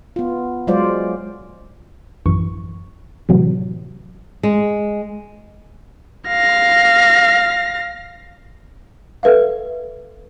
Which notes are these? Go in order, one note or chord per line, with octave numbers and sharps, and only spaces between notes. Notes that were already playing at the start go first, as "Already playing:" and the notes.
B3 F4
F#3 G#3 F4 C5 D5
A1 F#2 E3 C#6
A2 C3 E3 F#3
G#3
F5 A#6
A4 B4 E5 F5